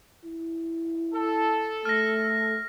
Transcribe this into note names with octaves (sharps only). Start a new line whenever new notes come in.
E4
A4
A3 F6 A#6